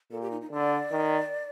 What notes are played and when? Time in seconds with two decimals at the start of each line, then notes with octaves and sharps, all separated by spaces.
0.11 A#2 A4
0.21 G4
0.31 D#4
0.41 D#4
0.51 D3 D5
0.91 D#3